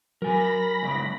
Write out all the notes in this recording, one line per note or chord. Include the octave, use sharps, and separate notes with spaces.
F#3 A#4 G#5 B5 A#6
C#2 F#2 D5